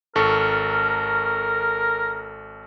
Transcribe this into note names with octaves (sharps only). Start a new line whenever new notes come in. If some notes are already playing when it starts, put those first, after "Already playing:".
G#1 A4 A#4 C#6